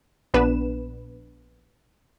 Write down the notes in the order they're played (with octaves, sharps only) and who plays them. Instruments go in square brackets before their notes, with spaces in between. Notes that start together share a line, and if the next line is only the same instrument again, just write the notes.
[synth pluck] A#1 B3 D4 B4 E7